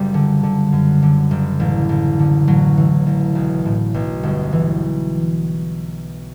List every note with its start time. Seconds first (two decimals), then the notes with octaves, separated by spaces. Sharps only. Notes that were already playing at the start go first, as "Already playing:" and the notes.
Already playing: F#1 G3
0.14 D3
0.43 D3
0.72 F#2
1.02 D3
1.31 F#1
1.60 A1
1.89 A1
2.19 D3
2.47 A1 F#3
2.78 E3
3.06 A1
3.35 B1
3.65 A2
3.94 B1
4.23 G1
4.52 E3